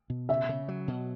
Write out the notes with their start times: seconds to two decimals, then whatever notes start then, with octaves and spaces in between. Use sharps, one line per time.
0.10 B2
0.29 C#3 E5
0.49 C#3
0.68 F#3
0.88 B2